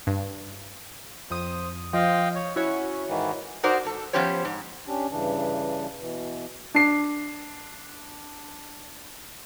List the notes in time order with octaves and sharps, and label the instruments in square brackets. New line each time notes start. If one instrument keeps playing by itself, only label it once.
[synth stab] G2
[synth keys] F2 D#6 [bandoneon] C5
[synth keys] F3 [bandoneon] D#5 F5 G5
[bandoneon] C#5
[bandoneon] C#4 [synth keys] E4 F#4 C#5
[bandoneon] G#2 D#3 E3
[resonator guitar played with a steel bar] D#4 F#4 A#4 C5 D5
G#2 A4
F3 B3 C#4 G4 C5 C#5
G#2
[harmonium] C#4 D4 G4
G2 C#3 E3 D4
B2 E3
[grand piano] D4 C7